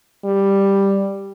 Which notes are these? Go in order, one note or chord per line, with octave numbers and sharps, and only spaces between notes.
G3